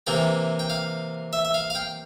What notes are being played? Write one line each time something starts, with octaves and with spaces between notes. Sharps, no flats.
C3 E3 A#3 G5
G5
F5
E5
E5
F5
F5
G5